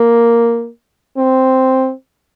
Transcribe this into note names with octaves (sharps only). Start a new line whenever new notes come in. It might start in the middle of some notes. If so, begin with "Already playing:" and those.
Already playing: A#3
C4